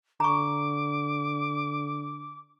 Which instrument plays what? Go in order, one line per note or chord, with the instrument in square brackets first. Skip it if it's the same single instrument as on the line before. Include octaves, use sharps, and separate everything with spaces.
[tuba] D3 [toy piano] A#5 C#6 [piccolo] D6